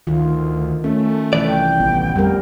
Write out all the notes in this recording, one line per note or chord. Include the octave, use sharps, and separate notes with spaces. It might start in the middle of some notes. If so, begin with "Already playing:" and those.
D2 D#3 F4
A3 C#4
C2 E3 D5
G5
A1 B3
F2 G3 A3 A#4